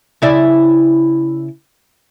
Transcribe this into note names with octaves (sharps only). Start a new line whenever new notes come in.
C#3 E4 D5